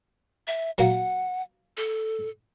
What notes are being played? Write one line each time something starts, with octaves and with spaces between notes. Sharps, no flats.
E5
F#3 A#3 F#5
A4